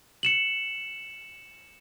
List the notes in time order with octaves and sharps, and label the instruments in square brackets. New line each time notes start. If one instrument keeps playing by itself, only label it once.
[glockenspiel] C#7 E7 F#7